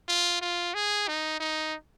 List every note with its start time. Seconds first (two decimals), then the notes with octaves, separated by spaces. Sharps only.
0.08 F4
0.41 F4
0.74 G#4
1.08 D#4
1.40 D#4